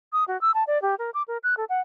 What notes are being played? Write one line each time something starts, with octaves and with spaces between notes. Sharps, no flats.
D#6
F#4
E6
A5
D5
G4
A#4
D6
A#4
F#6
A4
F#5